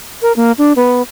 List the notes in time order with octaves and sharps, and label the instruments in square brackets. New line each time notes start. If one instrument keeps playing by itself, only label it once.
[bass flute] A#4
A#3
D4
B3